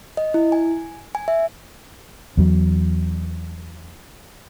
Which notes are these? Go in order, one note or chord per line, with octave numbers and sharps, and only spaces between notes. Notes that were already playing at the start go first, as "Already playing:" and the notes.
D#5
E4
G#5
G#5
E5
E2 F#3